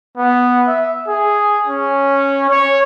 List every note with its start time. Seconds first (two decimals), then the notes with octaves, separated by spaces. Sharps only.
0.17 B3
0.67 E5
1.08 G#4
1.67 C#4
2.50 C#5